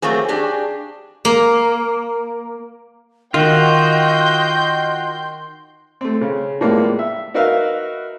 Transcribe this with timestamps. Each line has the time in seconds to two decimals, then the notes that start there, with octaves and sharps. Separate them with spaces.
0.02 F#3 A3 A#3 C4 G#4
0.28 D4 G4 G#4
1.25 A#3
3.34 D#3 F4 F#4 D#5 G5 C6 G6
6.01 A3 C4
6.21 C#3
6.61 A2 F3 G3 G#3 A#3 B3
6.99 E5
7.34 D#4 F#4 A#4 B4 E5 F5